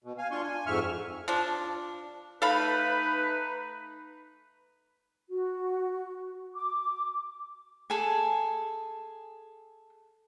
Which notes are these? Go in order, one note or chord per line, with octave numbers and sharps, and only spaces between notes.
B2
F5 G#5
D4 F4 C6 C#6
G#5
F2 G#2 E5 C#6 F6
F3 D4
A3 D#4 A4 B4 F5 B5
F#4
D6
G#4 A4 G#5